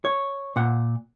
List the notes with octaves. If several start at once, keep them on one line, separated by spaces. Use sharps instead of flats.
C#5
A#2 F#5